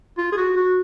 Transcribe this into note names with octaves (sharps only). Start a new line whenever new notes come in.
F4
G#4
F#4
F#4